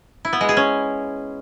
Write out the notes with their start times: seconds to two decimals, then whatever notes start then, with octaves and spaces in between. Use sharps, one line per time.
0.25 E4
0.33 B3
0.41 G#3
0.49 G#4
0.57 C#4